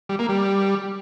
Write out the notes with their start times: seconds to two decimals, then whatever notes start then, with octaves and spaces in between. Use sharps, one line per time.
0.09 G3
0.19 A#3
0.29 G3